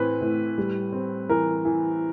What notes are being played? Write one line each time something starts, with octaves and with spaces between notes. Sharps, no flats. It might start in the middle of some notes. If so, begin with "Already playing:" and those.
Already playing: A2 E3 C4 B4
A2
G3
C4
E3 A#4
E3